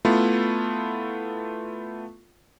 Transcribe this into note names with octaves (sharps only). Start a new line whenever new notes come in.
A3 B3 E4 F4